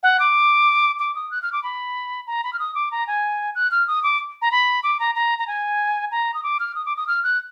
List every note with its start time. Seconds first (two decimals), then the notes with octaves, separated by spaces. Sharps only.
0.03 F#5
0.20 D6
0.99 D6
1.15 D#6
1.31 F#6
1.42 F6
1.52 D6
1.63 B5
2.27 A#5
2.44 B5
2.53 F6
2.59 D#6
2.75 D6
2.91 A#5
3.07 G#5
3.55 F#6
3.71 F6
3.88 D#6
4.03 D6
4.42 A#5
4.52 B5
4.83 D6
5.00 A#5
5.15 A#5
5.39 A#5
5.47 G#5
6.11 A#5
6.34 D#6
6.43 D6
6.60 F6
6.75 D#6
6.86 D6
6.97 D#6
7.07 F6
7.24 F#6